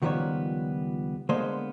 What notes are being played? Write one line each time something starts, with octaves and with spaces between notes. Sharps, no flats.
C#2 D#3 F3 G3 B3 C#5
D3 G#3 A#3 B3 C5